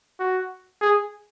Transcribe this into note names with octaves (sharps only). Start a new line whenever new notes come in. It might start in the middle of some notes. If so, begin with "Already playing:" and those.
F#4
G#4